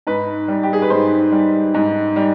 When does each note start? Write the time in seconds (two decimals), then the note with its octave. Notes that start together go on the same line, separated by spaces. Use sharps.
0.07 G#2 B4
0.48 G3
0.63 G4
0.73 G#4
0.82 B4
0.90 G#2 C5
1.32 G3
1.74 G#2
2.16 G3